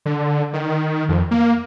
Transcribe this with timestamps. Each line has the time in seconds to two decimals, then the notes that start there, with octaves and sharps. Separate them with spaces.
0.06 D3
0.53 D#3
1.09 F2
1.31 A#3